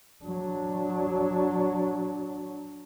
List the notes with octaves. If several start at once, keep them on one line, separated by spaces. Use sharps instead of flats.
F#3 D4